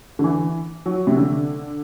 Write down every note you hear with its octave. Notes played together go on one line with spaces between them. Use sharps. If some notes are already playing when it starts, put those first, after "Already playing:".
D3
E3
F#3
C3
D3